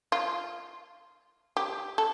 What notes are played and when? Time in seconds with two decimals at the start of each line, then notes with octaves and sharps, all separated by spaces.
0.12 F4
1.57 G4
1.98 A4